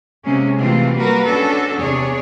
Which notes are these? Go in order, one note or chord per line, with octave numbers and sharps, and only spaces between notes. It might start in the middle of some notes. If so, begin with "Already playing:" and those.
C3 G#3 A#3 C#4
C3 E3 A3 C4 F4
G3 A#3 F#4 A#4 B4
C#4 D4 F#4 A4
E2 C3 D4 G#4 C#5 D5